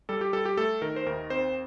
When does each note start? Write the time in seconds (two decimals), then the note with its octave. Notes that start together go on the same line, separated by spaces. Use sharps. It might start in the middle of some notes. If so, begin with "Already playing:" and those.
0.09 G3 A4
0.21 G4
0.33 G3 A4
0.45 G4
0.57 A3 A4
0.82 D#3 A#4
0.96 C5
1.06 D#2 A#4
1.30 C4 C5